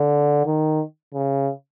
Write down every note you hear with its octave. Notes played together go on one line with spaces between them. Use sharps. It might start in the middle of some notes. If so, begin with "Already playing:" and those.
Already playing: D3
D#3
C#3